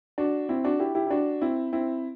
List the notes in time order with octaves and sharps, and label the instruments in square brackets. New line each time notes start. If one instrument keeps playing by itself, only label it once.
[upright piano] D4 F#4
C4 E4
D4 F#4
E4 G4
E4 G4
E4
D4 F#4
C4 E4
C4 E4